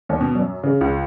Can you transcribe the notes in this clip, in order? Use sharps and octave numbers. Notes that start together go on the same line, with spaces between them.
D#2
B2
F#2
C#3
C#2